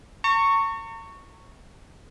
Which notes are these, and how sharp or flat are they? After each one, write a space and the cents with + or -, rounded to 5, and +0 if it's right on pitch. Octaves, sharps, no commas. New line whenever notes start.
A#5 -45 C#6 +0